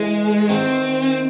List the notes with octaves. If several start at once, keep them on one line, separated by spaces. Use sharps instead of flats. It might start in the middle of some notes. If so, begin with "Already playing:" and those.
Already playing: E3 G#3
D#3 C4